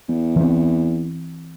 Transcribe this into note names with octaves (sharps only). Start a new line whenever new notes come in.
E2
E3 C4